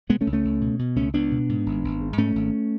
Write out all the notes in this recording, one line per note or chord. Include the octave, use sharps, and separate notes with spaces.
B2 G#3 B3
A3 C#4
C#2
A3 C#4
C#2
B2
B2
C#2 A3 C#4
C#2 B3 D4
B2
G#2
G#1
G#1
G#2
G#2 A3 C#4
G#1